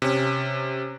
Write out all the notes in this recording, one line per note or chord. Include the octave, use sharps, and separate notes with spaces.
C3 C#4